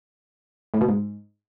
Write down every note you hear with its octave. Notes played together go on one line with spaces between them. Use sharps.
A2
B2
G#2